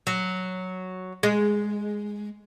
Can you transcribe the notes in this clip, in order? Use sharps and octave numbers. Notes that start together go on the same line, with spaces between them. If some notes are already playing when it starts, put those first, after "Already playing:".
F#3
G#3